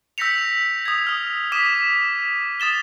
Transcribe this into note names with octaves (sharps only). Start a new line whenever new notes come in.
E6 G6 A#6 B6 C#7 F7
D#6 G#6
D#6 F6
D6 D#6 B6 D#7 E7
D#6 A6 E7 G7